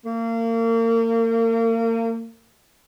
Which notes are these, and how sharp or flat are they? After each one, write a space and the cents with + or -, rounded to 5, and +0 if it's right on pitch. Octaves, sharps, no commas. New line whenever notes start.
A#3 -35